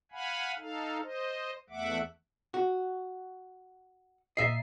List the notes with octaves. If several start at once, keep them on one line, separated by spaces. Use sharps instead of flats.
F5 F#5 G#5 B5
D#4 A4 F5
C5 D#5
E2 A3 E5 F#5 D6
F#4
A#2 D#5 E5 C7